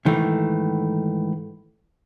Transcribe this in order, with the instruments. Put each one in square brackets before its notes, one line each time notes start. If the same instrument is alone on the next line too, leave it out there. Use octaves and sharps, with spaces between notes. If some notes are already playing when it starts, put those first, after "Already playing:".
[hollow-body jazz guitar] G#2 D#3 E3 A3